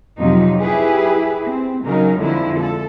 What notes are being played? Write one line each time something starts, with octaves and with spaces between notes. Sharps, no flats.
F2 C3 F3 F#3 D#4
E4 G4 G#4 B4
C4
C#3 F#3 D#4 A#4
F2 D3 F3 G#3 E4
A4